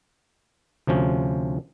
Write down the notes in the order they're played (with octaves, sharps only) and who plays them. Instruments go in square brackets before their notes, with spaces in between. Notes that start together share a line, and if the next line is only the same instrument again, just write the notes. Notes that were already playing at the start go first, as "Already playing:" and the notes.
[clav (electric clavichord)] D2 C3 F3 C#4